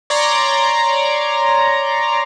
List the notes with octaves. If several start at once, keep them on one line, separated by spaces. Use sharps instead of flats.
C#5 D5 A#5 C6 D6